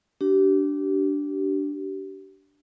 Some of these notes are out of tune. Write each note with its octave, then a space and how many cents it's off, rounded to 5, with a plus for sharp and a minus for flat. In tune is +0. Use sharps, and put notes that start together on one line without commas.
D4 -10 G4 -35